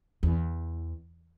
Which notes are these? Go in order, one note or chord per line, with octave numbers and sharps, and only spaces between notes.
E2